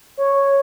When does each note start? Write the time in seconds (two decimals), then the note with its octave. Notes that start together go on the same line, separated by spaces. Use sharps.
0.17 C#5